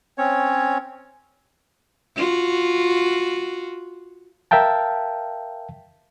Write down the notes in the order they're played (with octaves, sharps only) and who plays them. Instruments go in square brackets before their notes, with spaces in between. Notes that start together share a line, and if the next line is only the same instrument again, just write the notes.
[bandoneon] C4 C#4 C#5
[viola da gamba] F4 F#4
[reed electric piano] A#4 E5 F5 G5 A5